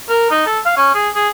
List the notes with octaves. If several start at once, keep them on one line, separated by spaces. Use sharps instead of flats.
A#4
D#4
A4
F5
C#4
G#4
G#4